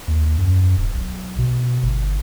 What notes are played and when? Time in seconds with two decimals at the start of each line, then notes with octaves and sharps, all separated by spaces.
0.08 D#2
0.38 F#2
0.77 D1
0.95 B1
1.38 B2
1.83 G1